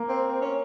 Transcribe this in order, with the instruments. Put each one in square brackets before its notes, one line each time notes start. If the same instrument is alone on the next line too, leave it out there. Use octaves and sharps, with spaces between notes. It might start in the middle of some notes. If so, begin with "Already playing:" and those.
Already playing: [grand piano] A#3
[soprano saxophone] C4
C4
C#4